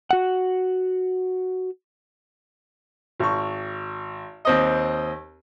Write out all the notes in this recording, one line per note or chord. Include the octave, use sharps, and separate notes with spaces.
F#4 F#5
G#1 C#6
D#2 C4 D#5